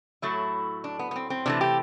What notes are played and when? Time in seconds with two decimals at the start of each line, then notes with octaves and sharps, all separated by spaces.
0.22 A2 F#3 A3 E4
0.84 D4
0.99 B3
1.11 B3
1.16 C4
1.30 C4
1.46 C3 E3 A3 D4
1.61 G4